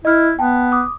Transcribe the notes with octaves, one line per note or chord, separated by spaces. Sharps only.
E4 D#5 F6
B3 G5 A5
D6 D#6